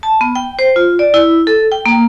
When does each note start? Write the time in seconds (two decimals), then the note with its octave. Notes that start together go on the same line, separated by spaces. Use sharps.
0.03 A5
0.21 B3
0.35 G5
0.59 C5
0.76 F4
0.99 D5
1.14 E4
1.47 A4
1.72 G5
1.86 A#3